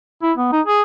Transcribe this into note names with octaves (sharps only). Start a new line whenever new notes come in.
E4
B3
D#4
G#4